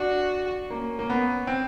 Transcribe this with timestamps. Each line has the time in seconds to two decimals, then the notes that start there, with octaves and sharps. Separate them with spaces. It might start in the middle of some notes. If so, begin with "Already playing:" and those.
Already playing: D4 F#4
0.70 A#3 C#4
0.99 A#3
1.10 B3
1.47 C4